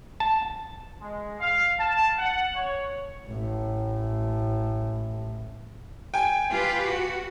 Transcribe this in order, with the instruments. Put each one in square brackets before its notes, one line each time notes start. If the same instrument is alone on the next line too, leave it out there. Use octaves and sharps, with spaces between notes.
[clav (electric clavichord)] A5
[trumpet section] G#3
F5
A5
F#5
C#5
[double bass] A1 A2
[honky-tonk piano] G5 G#5
[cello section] F4 G4 B4
F#4